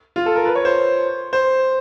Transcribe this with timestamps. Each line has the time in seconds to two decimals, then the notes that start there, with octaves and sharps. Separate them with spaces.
0.16 F4
0.26 A4
0.36 A#4
0.45 B4
0.55 C#5
0.65 C5
1.33 C5